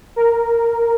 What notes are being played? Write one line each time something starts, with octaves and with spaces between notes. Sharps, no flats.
A#4